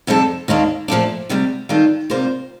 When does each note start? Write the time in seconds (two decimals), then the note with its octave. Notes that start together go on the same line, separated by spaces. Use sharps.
0.07 F2 C3 G3 D4 A4
0.48 D#2 D#3 A#3 D4
0.88 A#2 F3 A3 D4
1.29 D2 C3 G3
1.69 D#3 G3 D4 F4 A4
2.10 C3 G3 A#3 F4 C5